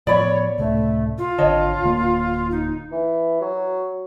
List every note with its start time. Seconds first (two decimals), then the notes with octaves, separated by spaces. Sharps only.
0.07 A2 F3 B3 C#5 D5 B5
0.58 C#2 A2 C3 A3
1.18 F4
1.38 G#1 D3 C#5 D#5 A5
1.82 D1 D3 A#3
2.51 D#4
2.92 E3
3.41 F#3